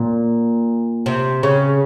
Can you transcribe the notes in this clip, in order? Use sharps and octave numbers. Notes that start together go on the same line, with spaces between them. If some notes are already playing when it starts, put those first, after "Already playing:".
Already playing: A#2
C3
C#3